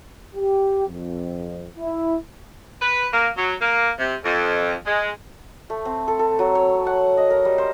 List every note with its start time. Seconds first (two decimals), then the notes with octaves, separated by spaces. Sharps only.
0.35 G4
0.87 F2
1.78 E4
2.80 B4
3.12 A#3
3.36 F#3
3.60 A#3
3.98 C3
4.23 F2
4.85 G#3
5.70 A3
5.85 C4
6.08 A4
6.19 A4
6.39 F#3
6.55 C#5
6.87 F#5
7.17 D#5
7.30 A#4
7.45 G3
7.58 C5